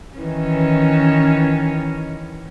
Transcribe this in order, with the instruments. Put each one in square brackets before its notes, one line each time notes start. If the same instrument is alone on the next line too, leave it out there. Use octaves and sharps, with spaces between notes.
[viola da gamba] D#3 E3 C#4